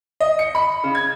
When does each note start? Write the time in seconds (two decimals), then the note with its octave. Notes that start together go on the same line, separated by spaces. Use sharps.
0.20 D#5
0.39 C#7
0.55 B5
0.84 C#3
0.95 G#6